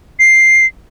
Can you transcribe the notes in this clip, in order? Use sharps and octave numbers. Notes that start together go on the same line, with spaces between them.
C7